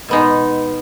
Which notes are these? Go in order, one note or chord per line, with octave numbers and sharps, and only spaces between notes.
B2 G#3 B3 D#4